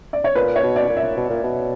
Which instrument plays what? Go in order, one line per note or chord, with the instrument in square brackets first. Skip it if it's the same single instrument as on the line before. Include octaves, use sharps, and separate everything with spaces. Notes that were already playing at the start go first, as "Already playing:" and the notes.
[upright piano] D5
C#5
[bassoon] A#2 [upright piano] B4
[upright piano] C#5
[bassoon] B2
[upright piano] D5
[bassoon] A#2
[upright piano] E5
[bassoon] B2
A#2
B2